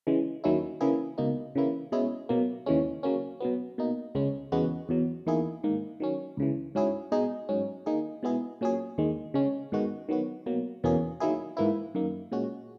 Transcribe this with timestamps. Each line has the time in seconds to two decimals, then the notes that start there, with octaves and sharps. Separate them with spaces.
0.07 C#3 E3 G#3
0.44 D#2 D#3 F#3 C#4 E4
0.81 C#3 E3 A#3 E4 G#4
1.18 C#2 B2 A#3 D#4
1.55 C#3 E3 A#3 E4
1.92 B2 G#3 C#4 E4 G#4
2.29 B2 F#3 A#3
2.66 D#2 C#3 E3 G#3 C#4
3.03 C#3 F#3 A#3 C#4
3.40 B2 F#3 B3
3.78 B2 A#3 D#4
4.15 C#2 C#3 G#3 C#4
4.52 E2 C#3 G#3 B3 F#4
4.89 E2 B2 F#3
5.26 E2 D#3 A#3 E4 G#4
5.64 G#2 D#3 A#3
6.00 D#3 F#3 C#4
6.37 C#2 C#3 E3
6.75 G#2 F#3 C#4 E4 G#4
7.12 B2 G#3 D#4 G#4
7.49 G#2 F#3 C#4
7.86 D#3 A#3 D#4 G#4
8.23 B2 G#3 B3 E4 G#4
8.61 A#2 F#3 C#4 G#4
8.98 D#2 D#3 G#3
9.34 C#3 G#3 C#4
9.72 G#2 D#3 G#3 B3 F#4
10.09 D#3 F#3 B3 F#4
10.46 B2 F#3 A#3
10.84 E2 B2 A#3 C#4 G#4
11.20 D#3 F#3 A#3 E4 G#4
11.57 G#2 E3 A#3 E4
11.95 F#2 D#3 A#3
12.32 A#2 G#3 C#4 F#4